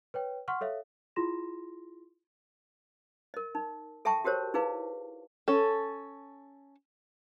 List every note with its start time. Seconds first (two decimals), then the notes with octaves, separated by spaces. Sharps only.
0.14 B4 C#5 G5
0.48 F#5 C6 C#6 F6
0.61 A4 C#5 E5 F5
1.16 E4 F4 G#4 C6 A#6 E7
3.34 A#4 D#5
3.55 D#4
4.05 A4 E5 G5 A5 C#6
4.25 F#4 G4 A#4 C5 C#5
4.54 D#4 E4 G#4 B4 F5
5.48 C#4 A4